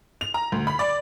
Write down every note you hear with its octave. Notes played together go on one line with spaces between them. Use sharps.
F7
A#5
D2
B5
D5